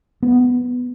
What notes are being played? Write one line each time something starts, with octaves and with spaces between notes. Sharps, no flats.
B3